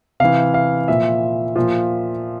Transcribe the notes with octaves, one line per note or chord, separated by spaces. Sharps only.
C3 E3 F5
F5
A#2 F3 E5
A#2 F3